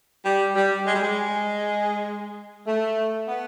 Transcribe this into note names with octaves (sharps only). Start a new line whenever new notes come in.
G3
G3
G#3
G3
G#3
A3
B3